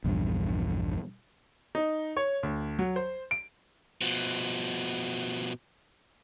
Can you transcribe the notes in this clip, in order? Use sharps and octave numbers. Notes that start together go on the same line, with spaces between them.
A#1 E2 G2
D#4
C#5
D2
F#3
C5
D7
B2 F3